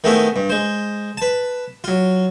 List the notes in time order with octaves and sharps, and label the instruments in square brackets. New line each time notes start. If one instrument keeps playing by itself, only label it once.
[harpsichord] D#3 G#3 A3 B3 C4 E4
G2
G#3 C5
B4 A5
F#3 F4